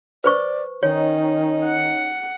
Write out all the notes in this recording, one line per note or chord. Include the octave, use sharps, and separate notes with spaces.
B4 C5 D5 C#6
D#3 C#4 D#4 C#5
F#5